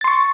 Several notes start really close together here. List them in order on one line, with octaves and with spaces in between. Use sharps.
A6 C6 C#6